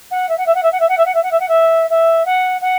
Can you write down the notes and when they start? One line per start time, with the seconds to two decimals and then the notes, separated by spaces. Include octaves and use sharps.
0.11 F#5
0.28 E5
0.37 F#5
0.46 E5
0.54 F#5
0.62 E5
0.72 F#5
0.80 E5
0.89 F#5
0.97 E5
1.05 F#5
1.14 E5
1.23 F#5
1.31 E5
1.39 F#5
1.48 E5
1.90 E5
2.25 F#5
2.61 F#5